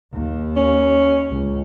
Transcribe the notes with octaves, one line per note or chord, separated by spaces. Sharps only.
D#2
C#4
C#2